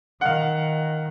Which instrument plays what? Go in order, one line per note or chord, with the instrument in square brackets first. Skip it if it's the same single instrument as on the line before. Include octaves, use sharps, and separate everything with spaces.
[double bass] D#3 [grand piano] F5 F#5